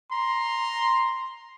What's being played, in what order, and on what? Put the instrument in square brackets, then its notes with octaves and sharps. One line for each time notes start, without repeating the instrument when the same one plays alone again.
[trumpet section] A#5 C6